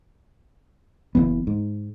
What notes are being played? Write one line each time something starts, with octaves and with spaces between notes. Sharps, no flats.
F#1 D#2 E3 B3
G#2